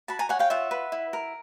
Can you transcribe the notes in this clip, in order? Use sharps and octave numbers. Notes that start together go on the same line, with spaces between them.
F#4 A5 B5
G#5 A#5
C#5 F#5 G#5
F5 G5
F4 E5 F#5
B4
E4
A#4